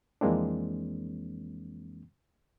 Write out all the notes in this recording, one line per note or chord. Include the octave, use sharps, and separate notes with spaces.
F2 E3 G#3 A#3 C4 D4